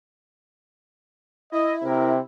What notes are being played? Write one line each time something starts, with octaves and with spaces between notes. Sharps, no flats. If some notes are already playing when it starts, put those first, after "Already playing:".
E4 D#5
C3 A#4 B4